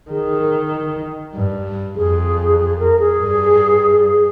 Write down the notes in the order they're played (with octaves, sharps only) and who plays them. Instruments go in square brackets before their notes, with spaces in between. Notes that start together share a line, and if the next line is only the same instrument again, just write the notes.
[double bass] D#3 [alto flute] G#4
[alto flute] A#4
[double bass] G2
[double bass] F2 [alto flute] G#4
[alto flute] G#4
A#4
G#4
[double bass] G2